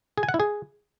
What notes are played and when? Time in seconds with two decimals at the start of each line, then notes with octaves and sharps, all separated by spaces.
0.18 G#4
0.23 G#5
0.29 F#5
0.34 E4
0.40 G#4